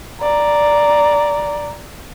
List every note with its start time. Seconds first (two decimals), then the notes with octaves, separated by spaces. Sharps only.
0.22 D5 A#5